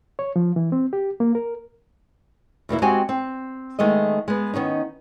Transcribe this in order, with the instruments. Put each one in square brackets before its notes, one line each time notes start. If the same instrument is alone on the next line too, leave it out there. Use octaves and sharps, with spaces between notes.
[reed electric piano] C#5
F3
E3
C4
G4
A#3
A#4
[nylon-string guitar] E2 B2 A#3 E4
G#3 C4 F#4 G4 F#5 G#5
C4
D#3 G#3 A3 B3 D#5
G#3 B3
D#3 B3 C#4 D#4